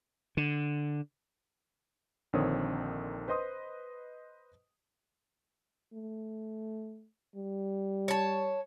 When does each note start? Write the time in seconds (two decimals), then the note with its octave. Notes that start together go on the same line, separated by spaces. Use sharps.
0.37 D3
2.33 A#1 D3 D#3 C4 C#5 D#6
3.28 B4 C5 D#5 C6 D#6
5.94 A3
7.36 G3
8.08 C#5 A5